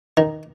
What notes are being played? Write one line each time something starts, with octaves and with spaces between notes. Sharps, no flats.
D#3